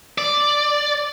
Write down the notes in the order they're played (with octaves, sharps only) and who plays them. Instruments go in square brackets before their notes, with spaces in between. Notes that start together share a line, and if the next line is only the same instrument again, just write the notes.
[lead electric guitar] D5